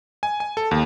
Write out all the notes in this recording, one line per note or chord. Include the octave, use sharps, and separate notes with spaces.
G#5
G#5
A4
D#2